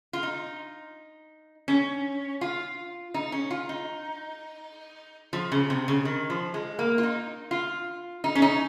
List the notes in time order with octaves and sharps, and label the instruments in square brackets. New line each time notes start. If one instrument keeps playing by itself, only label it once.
[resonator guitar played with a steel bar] F4
D#4
C#4
F4
D#4
C#4
F4
D#4
F3
C#3
C3
C#3
D#3
F3
G#3
A#3
F4
D#4
F4
D#4
C#4
D#4